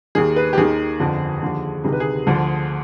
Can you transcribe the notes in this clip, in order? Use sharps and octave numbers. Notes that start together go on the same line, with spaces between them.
D#2 D#3 G#4
B4
G4
D#2 D#3 G#4
G1 F2 D3 F3
D#2 D3 F3
D2 C3 D#3 G#4
B4
G#4
D2 D3 F3